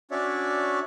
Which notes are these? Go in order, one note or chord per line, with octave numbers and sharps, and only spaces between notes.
C#4 D4 F#4 C#5 D5 E5